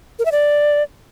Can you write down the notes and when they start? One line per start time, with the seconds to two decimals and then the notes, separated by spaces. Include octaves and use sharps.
0.19 A#4
0.25 E5
0.32 D5